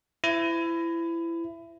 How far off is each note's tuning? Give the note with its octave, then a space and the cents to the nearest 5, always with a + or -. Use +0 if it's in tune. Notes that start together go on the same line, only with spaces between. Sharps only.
E4 +20 C5 -35